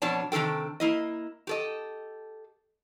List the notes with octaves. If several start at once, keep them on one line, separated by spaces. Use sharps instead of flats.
F2 B2 D4 C#5 D5 A5
C3 D#3 D4 A4 G5
A#3 E4 D#5
G4 A4 D#5